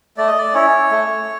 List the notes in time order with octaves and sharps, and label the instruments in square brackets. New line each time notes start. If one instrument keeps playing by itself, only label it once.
[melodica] A3 D5
D#5
D5
C#4 E4 C#5
A3